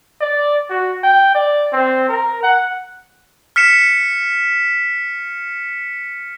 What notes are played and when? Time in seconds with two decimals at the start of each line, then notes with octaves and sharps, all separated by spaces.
0.21 D5
0.70 F#4
1.04 G5
1.35 D5
1.73 C4
2.09 A#4
2.43 F#5
3.56 F6 B6 C#7 E7